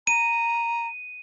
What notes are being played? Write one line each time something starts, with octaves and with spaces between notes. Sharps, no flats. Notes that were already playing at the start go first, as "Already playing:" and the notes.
A#5 D#7